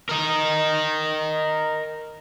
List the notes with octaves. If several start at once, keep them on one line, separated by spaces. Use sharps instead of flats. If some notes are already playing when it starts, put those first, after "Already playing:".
A#4 D#5